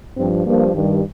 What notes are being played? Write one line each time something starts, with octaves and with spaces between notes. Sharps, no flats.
G2 F3 C4
G2 F3 A#3
G2 D#3 G3